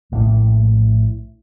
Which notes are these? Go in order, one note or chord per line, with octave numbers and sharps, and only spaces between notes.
A#1 A2 A#3
A3
A#3